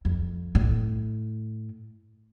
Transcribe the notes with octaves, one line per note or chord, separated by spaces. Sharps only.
F2
A2